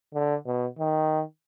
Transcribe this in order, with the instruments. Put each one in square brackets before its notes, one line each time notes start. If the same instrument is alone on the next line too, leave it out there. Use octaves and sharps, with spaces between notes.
[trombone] D3
B2
D#3